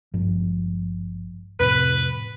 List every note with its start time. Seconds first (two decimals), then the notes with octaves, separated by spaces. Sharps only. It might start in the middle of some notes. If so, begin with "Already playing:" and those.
0.14 G#1 G2 F3
1.60 F2 A2 C3 B4